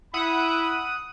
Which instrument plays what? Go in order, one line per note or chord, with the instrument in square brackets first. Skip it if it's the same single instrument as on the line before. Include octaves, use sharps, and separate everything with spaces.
[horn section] E4 B5 [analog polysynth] F#5 D#6